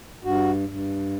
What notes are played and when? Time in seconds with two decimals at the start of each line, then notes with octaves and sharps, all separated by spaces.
0.24 G2 F#4
0.69 G2